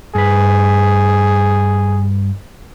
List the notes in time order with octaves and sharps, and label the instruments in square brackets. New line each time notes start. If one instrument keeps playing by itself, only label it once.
[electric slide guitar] G2 B4 [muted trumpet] G#4